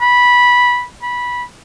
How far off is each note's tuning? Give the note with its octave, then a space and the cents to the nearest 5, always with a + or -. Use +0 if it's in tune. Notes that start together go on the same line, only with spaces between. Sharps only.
B5 -10
B5 -15